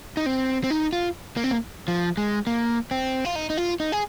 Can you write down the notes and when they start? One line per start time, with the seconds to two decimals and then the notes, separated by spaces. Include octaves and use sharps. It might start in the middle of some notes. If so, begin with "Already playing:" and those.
0.17 D#4
0.26 C4
0.64 C4
0.70 D#4
0.93 F4
1.37 A#3
1.44 C4
1.51 A#3
1.88 F3
2.17 G#3
2.47 A#3
2.91 C4
3.25 F4
3.36 D#4
3.50 D#4
3.57 F4
3.80 D#4
3.92 G#4